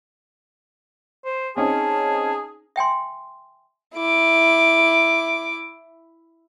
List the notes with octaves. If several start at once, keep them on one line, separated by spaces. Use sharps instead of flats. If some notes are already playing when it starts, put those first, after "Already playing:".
C5
C4 C#4 D#4 G#4 A5
E5 G5 G#5 C6
E4 D6